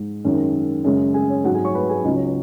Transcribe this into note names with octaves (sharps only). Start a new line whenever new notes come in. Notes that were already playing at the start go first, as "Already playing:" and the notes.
Already playing: G#2 G#3
F#2 D#3 G#3
F#2 C#3 G#3
G#4 G#5
C#5
G#2 F#3 F#4 F#5
G#4 G#5
C#5 C#6
B4 B5
G#4 G#5
C#2 C#3 F#3 D#4 D#5
C#5
C#5